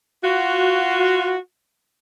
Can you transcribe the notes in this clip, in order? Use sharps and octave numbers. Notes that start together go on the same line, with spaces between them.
F4 F#4